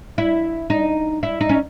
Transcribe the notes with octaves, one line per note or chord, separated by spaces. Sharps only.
E4
D#4
E4
D#4
C#4